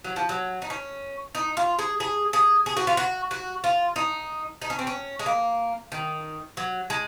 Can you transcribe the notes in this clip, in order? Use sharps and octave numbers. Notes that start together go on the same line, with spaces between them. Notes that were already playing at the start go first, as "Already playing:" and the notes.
F#3
F3
F#3
D#4
C#4
D#4
F4
G#4
G#4
G#4
G#4
F#4
F4
F#4
F#4
F4
D#4
D#4
C#4
C4
C#4
G#3
A#3
D#3
F#3
G#3